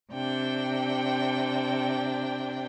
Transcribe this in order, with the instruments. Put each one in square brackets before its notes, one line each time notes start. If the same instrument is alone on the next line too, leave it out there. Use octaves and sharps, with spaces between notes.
[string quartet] C3 D4 G5